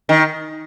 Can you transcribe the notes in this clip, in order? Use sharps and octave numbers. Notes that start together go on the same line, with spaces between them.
D#3